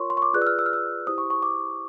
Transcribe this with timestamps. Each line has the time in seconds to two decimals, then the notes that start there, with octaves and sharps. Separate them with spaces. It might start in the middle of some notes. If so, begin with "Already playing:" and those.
Already playing: F4 A#4 C#5 C6 C#6
0.10 C6
0.17 C#6
0.22 D6
0.34 F4 G#4 B4 D5 F#6
0.42 E6
0.47 F6
0.59 E6
0.66 F6
0.73 E6
1.07 E4 G4 C5 D#6
1.18 C#6
1.30 C#6
1.43 D6